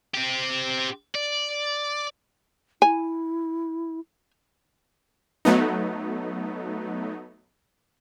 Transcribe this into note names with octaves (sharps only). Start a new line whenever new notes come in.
C4 G4
D5
E4 G#5
F#3 A3 B3 D#4